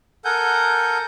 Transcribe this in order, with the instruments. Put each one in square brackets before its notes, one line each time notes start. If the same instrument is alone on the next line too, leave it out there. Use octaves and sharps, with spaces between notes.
[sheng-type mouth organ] A4 A#4 F#5 G#5 G6